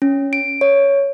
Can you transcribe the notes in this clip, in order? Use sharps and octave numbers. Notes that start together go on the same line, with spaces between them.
C#4
D7
C#5